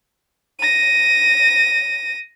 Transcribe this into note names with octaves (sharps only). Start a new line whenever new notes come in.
A#6 D#7